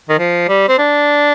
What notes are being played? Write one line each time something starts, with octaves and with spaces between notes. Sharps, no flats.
D#3
F3
G3
C4
D4